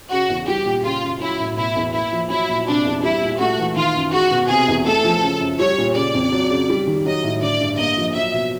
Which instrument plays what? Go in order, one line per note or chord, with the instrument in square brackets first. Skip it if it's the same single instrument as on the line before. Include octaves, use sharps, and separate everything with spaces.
[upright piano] C#3 [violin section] F#4
[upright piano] E2
[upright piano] G3 [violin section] G4
[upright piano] A#2
[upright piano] C#3 [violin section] F4
[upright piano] F#2
[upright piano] F#3 [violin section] E4
[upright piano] A2
[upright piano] B2 [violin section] E4
[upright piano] E2
[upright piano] A#3 [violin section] E4
[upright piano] F3
[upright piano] F#3 [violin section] E4
[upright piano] A#2
[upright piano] C3 [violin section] D4
[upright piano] E2
[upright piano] G3 [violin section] E4
[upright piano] A#2
[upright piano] A3 [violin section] F#4
[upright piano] E3
[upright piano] D#3 [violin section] F4
[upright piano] F#2
[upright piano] G#3 [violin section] F#4
[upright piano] B2
[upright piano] C3 [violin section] G#4
[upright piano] E2
[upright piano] A3 [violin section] A4
[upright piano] F3
C#3
F#2
[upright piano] G3 [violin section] C#5
[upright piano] A#2
[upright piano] C#3 [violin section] D5
[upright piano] F2
F#3
C#3
G3
D#3
[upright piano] F#3 [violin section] D#5
[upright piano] A2
[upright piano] D3 [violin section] D5
[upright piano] G2
[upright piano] A#3 [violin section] D#5
[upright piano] F3
[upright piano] F#3 [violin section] E5
[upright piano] B2